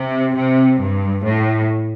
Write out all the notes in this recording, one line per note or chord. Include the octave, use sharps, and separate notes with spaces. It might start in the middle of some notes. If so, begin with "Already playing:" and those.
Already playing: C3
C3
G2
A2